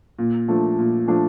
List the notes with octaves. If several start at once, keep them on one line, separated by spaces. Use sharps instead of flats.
A#2
F3 A3 D4
A#2
F3 A3 D4